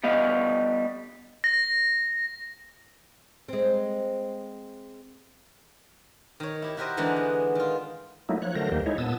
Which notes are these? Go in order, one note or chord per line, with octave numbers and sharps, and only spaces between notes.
G3 B3 D#5 F5
A#6
G#3 C4
D#3 C#5
E4 G4
E4 F#4 G4 A#4 C5 D#5
D3 E3 G#3 D4 D#4
B3
D#3 F4
F#3 A3 A#3 D#4 E4
F3 C#5 F#6
D3 F#3 A3 A#4 C5 A#6
D#2 D#3 A#3 G4 C5
G#3 D#4 E4 C#5
A#2 B3 A5 D#6 E6